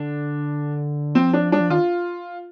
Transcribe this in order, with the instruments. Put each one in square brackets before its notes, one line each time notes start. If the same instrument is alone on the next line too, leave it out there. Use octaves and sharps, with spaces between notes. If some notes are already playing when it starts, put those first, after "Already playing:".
Already playing: [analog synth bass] D3 [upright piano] D4
[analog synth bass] F3 [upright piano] C4
[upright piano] D4
[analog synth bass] G3 [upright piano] D4
[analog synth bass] F3
[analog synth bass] D#3 [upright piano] F4